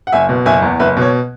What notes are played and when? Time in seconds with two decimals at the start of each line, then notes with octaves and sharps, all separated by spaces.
0.07 F#5
0.12 F#1 E5 G#5
0.29 B2
0.45 F#1 E5 G#5
0.62 E2
0.80 F#1 B4 E5
0.97 B2 C#5